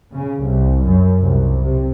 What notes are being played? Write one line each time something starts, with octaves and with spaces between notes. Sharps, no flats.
C#3
C2
F#2
C2
C3